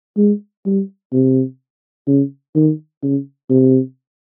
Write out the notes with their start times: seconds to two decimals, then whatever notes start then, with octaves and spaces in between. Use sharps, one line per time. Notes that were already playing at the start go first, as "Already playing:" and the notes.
0.17 G#3
0.66 G3
1.13 C3
2.07 C#3
2.55 D#3
3.03 C#3
3.50 C3